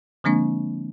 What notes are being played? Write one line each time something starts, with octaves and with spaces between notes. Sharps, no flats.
D3 F3 G#3 A#3 C4 D4